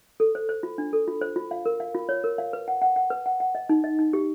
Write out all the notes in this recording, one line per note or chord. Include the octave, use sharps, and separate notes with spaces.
A4
C5
C5
F4
D4
A4
F4
C5
F4
F5
A#4
F5
F4
C#5
A#4
F5
B4
F#5
F#5
F#5
B4
F#5
F#5
D#5
D#4
D#5
D#4
G4